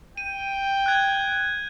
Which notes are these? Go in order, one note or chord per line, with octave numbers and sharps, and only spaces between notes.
G5 D#7
F#6 G#6